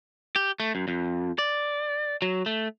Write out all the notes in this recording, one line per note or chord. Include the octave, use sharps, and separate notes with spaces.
G4
A3
F#2
F2
D5
F#3
A3